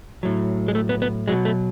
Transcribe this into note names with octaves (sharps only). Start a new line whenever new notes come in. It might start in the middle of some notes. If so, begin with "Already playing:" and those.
A2 F#3
G#3
A3
B3
B3
B2 F#3 G#3
A3